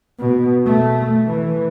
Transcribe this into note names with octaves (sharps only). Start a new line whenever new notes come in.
B2
A3
E3